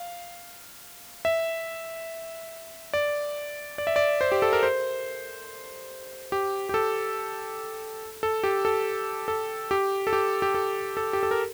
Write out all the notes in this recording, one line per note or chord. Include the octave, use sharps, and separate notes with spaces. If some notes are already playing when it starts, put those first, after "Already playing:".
Already playing: F5
E5
D5
D5
E5
D5
C5
G4
A4
A#4
C5
G4
G4
A4
A4
G4
A4
A4
G4
A4
G4
G4
A4
A4
G4
A4
A#4